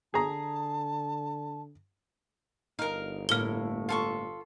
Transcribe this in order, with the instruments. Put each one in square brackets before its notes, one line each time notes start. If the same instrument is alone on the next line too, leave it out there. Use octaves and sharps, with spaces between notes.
[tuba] D3 [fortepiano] G#4 A#5 [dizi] A5
[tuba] G1 [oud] D#4 [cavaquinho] A#4 F5
[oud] A2 A#3 [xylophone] F6 G7
[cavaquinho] F4 A4 C#6